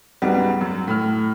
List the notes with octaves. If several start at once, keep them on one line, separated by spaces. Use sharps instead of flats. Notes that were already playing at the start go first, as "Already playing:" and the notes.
C#2 G#2 F#3 G3 B3
F#2
A2 F6